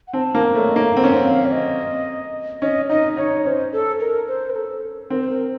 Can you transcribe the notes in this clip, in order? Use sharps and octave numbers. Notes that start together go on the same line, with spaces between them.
F#5
C4 A5
A#3
C5
A3
C#5
A#3 D#5
F5
C4 F#5
C#4
C4
F5
C#5
D#5
C#4 D#5
D#4 D#5
D#4 C#5
C#4 C5
A4
A#4
C5
A#4
A4
C4 A#4
C5
A#4